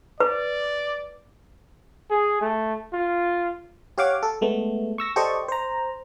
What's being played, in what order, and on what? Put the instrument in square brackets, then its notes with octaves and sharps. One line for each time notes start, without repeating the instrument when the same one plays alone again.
[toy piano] B4 [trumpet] D5
[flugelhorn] G#4
A3
F4
[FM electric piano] G4 C#5 F5 F#5 D6
A4
G#3 A3 B3
C#6 E6 A#6
G4 A4 C5 D5 D#5 C#6
C5 A#5